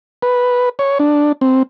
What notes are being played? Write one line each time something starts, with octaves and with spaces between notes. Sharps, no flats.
B4
C#5
D4
C4